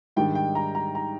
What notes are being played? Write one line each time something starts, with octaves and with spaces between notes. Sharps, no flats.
G#2 D#3 G3 D4 G5
G5
A#5
A#5
A#5